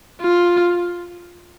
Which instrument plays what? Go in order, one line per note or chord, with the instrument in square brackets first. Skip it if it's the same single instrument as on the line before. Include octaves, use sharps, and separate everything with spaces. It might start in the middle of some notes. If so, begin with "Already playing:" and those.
[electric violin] F4